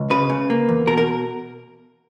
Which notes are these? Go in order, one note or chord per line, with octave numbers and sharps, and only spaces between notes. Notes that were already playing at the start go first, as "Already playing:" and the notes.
Already playing: C#2
C#3 B4
C#3
A#3
E2
B2 A#4
A#4